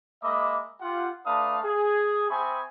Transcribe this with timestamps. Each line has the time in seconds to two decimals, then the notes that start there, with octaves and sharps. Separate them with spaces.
0.23 G#3 A#3 D#5 E5 B5 D6
0.81 F4 G4 F#5
1.26 A3 D4 B4 F5 A#5 D#6
1.63 G#4
2.30 C4 E5 G#5 B5 C#6 D#6